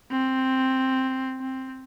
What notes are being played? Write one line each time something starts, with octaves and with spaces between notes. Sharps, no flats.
C4
C4